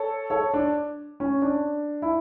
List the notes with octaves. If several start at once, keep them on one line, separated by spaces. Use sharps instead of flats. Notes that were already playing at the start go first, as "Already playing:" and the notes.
Already playing: A4 C#5
A4 C#5
D4
C#4
D4
E4